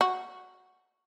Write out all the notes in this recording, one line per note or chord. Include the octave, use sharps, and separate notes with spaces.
F#4